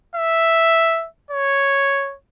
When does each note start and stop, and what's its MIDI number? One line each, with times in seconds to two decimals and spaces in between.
0.15 1.07 76
1.30 2.15 73